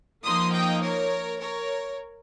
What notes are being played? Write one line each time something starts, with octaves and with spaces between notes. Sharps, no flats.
F3 A#3 D#4 C6 D#6
D#5 G5
A#4 C#5
A#4 C#5